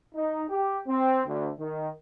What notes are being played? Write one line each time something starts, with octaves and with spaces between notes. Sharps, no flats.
D#4
G4
C4
D2
D#3